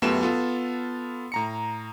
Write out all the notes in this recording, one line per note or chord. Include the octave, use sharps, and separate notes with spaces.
F#2 A3 B3 F4 G4 E7
B3 F4 A4
A2 A#5 C#7